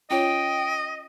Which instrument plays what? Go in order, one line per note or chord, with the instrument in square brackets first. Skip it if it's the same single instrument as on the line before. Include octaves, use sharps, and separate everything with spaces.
[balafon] C#4 F4 C#5 [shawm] D#5 [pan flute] G5